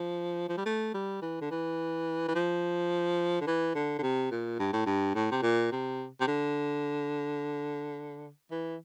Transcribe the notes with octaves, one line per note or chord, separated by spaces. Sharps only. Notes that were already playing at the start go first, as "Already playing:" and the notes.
Already playing: F3
F3
G3
A3
G3
E3
D3
E3
E3
F3
D3
E3
D3
D3
C3
A#2
G2
A2
G2
A2
C3
A#2
C3
C3
D3
E3